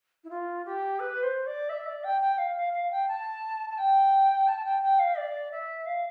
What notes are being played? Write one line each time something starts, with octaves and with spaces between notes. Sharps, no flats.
E4
F4
G4
B4
C5
D5
E5
D5
G5
G5
F5
F5
F5
G5
A5
A5
G5
A5
G5
G5
F5
D5
E5
F5